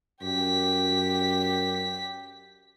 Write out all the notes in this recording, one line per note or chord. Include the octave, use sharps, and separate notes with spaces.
F#2 G4 B6